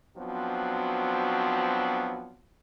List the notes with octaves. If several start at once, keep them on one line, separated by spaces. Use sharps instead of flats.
F3 F#3 B3 C4 D4 F#4